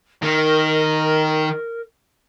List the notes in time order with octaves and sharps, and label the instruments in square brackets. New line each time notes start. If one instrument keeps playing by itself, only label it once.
[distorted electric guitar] D#3 [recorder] A#4